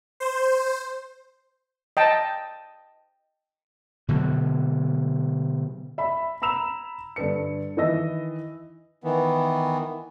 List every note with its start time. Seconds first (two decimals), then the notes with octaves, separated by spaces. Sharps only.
0.20 C5
1.97 D#5 G5 A5
4.08 B2 D3 F#3
5.98 E5 B5
6.42 A#5 B5 E6 E7 F7
7.16 G2 D3 B4 C#7
7.77 D#3 E3 B4 D#5 E6 A#6
9.04 D#3 E3 B3